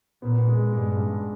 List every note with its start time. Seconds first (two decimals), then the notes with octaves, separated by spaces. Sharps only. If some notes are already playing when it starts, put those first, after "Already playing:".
0.22 A#2 B3
0.47 G#3
0.72 G2 G#3
0.97 G2